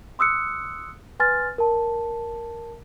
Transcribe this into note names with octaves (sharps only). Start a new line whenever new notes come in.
C6 D#6 E6 F#6 C#7
B4 G#5 C6 F6 A6
A#4 A5